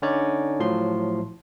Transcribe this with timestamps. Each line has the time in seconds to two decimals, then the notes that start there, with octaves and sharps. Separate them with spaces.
0.02 D3 C#4 D#4 C#5 D5
0.60 A2 F3 F#3 C6